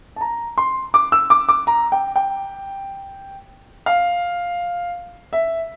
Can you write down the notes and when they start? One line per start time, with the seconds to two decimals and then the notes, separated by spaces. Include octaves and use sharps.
0.16 A5
0.21 A#5
0.58 C6
0.94 D6
1.12 E6
1.30 D6
1.49 D6
1.67 A#5
1.92 G5
2.16 G5
3.86 F5
5.33 E5